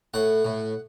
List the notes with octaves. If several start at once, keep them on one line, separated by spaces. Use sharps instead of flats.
A2 F#5
A2